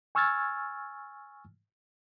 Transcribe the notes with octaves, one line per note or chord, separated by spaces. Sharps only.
G#5 C#6 E6 F6 G#6 A6